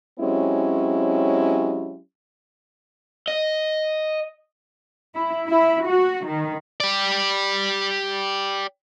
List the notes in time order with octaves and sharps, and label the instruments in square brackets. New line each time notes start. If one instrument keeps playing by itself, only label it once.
[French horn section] F#3 G#3 C4 C#4 E4 G4
[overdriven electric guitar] D#5
[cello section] E4
E4
F#4
D#3
[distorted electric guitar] G4 D5